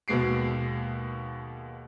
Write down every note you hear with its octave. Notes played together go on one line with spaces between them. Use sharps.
D#2 B2 G#3 C7 D7